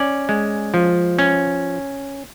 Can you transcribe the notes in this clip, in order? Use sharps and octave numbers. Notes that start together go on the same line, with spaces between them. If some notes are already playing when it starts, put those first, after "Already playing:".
Already playing: C#4 D5
G#3
F3
C#4